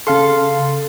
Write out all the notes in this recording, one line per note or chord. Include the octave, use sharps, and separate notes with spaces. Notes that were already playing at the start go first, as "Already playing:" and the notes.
C#3 A4 F5 C6